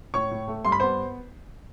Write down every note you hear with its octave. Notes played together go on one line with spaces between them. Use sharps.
A2 C#5 C#6
A2
A3
G2 C6
B5
B3 C5 C6